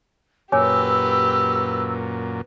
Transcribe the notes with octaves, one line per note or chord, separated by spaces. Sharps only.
F#2 A#2 G4 B4 C#5 G#5 D6 E6